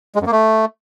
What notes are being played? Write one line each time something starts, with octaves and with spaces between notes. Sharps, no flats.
G#3
F#2
A#3
A3